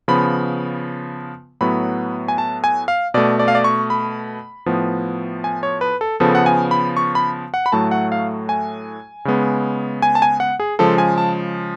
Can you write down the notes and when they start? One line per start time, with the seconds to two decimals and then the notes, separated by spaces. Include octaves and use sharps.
0.08 C#3 F3 B3 B5
1.61 A2 F#3 B3 B5
2.28 G#5
2.38 A5
2.64 G#5
2.88 F5
3.14 B2 A3 D5
3.39 D5
3.48 F5
3.55 D5
3.64 C#6
3.90 B5
4.66 A2 F3 B3
5.44 G#5
5.63 C#5
5.81 B4
6.01 A4
6.20 C#3 F3 B3 A4
6.35 F#5
6.46 G#5
6.71 B5
6.97 C#6
7.15 B5
7.54 F#5
7.66 B5
7.72 A2 F#3 A3 A5
7.91 F#5
8.12 F5
8.49 G#5
9.25 C#3 G#3 B3
10.02 G#5
10.15 A5
10.22 G#5
10.40 F#5
10.60 G#4
10.79 C#3 F3 G#3 A4
10.98 G#5
11.18 A5